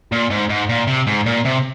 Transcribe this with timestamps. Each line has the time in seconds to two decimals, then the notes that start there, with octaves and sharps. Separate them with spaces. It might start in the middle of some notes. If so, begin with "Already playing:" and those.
0.12 A#2
0.30 G#2
0.49 G#2
0.69 A#2
0.87 C3
1.07 G#2
1.26 A#2
1.45 C3